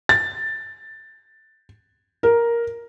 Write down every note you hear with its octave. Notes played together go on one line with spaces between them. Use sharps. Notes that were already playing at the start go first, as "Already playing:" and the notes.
A6
A#4